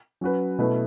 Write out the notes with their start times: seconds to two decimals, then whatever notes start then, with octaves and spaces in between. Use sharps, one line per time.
0.21 F#3 C#4 F#4 B4
0.59 B2 A3 E4 B4